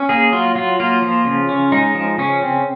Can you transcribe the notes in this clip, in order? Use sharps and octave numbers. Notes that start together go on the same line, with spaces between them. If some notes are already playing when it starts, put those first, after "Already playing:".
Already playing: C#4
A#3 G#4
F#3 F4
F#3 F4
A#3 F4
F3
C#3
C#4
G#3 D#4
F3
C#3 C#4
C4